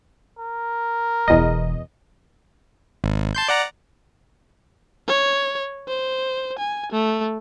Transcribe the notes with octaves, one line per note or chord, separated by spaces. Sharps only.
A#4
E1 E2 E3 D#5
G#1
A5 C6 G6
D5 F#5 A#5
C#5
C5
G#5
A3